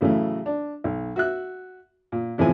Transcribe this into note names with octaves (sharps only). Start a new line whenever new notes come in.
A2 C#3 E3 F#3 A3
D4
B1
F#4 E5 F#6
A#2
E2 A2 C3 F3 G#5